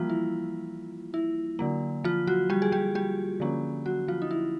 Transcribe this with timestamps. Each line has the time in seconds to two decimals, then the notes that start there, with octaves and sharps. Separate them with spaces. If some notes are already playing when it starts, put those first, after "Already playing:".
Already playing: E3 F3 G3 A#3 F4
0.10 E4
1.14 E4
1.59 D3 F#3 A#3
2.04 F3 F4
2.27 F#3 F#4
2.50 G3 G4
2.62 G#4
2.72 G3 G4
2.95 G3 G4
3.40 D3 F3 A#3 C#4
3.86 F#3 F#4
4.08 F3 F4
4.22 D#4
4.31 E4